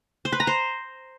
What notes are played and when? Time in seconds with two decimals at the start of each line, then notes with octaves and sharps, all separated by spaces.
0.25 C5
0.32 B4
0.40 A#5
0.47 C5